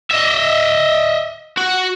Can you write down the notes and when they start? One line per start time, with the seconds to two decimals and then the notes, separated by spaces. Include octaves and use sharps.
0.11 D#5 E5
1.58 F#4